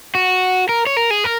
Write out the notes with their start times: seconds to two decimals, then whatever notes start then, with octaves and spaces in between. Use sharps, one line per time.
0.15 F#4
0.69 A#4
0.87 C#5
0.97 A#4
1.11 G#4
1.24 A#4